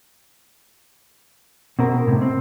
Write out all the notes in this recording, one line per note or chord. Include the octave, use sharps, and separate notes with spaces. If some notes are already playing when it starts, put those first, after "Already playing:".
B2 C4 A#4
A2 C3
C4